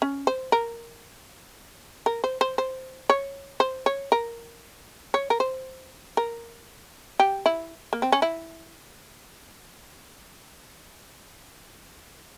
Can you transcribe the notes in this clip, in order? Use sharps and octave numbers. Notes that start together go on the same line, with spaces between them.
C#4
C5
A#4
A#4
C5
C5
C5
C#5
C5
C#5
A#4
C#5
A#4
C5
A#4
G4
E4
A#3
C4
C#4
E4